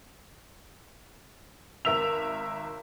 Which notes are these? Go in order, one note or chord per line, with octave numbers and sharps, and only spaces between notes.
G#1 A#4 E5 E6 F7